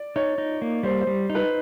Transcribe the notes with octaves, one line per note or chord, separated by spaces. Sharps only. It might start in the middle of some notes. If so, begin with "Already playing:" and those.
Already playing: D5
D#4 C#5
D#4
A#3
G3 C5
C5
G3
D#4
B4